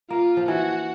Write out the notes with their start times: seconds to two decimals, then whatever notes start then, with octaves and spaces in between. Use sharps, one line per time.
0.10 A#3 F4
0.37 F3
0.48 E3 F#4